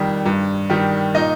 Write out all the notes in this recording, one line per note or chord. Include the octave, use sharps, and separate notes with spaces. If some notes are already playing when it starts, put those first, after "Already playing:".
Already playing: F2 D#3 G3
G2
D#3 G3
A#2 D#4 D#5